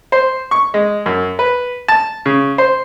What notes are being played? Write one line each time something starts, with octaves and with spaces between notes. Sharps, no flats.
C5
C#6
G#3
F#2
B4
A5
C#3
C5